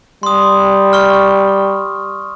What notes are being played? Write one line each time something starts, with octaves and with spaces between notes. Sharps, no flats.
G3 C6 D#6
C#6 F6